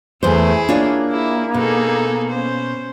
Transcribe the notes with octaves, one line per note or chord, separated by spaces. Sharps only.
E2 A3 E4 G#4 C5
A#3 D4 F4 C#5
E4 G#4
B2 D#4 G#4 A4
C#4 C5